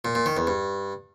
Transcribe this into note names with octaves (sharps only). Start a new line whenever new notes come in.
A#2
A#2
D#3
E2
G2